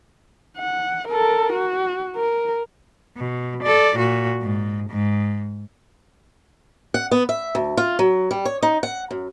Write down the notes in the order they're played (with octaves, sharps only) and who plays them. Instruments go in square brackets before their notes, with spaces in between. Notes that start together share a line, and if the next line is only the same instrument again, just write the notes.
[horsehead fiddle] F#5
A4 A#4
F#4
A#4
[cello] B2
A4 D5
A#2 F#4
G#2
G#2
[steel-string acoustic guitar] F#5
B3
E5
D2
F4
F#3
G3
C#5
D#4
F#5
F#2